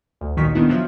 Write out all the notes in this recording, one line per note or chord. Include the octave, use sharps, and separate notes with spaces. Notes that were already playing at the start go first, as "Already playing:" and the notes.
D2
A1 A#2 D#3 F#3 C#6 B6
A2 D#3 B3 D4 E4
F3 F#3 E5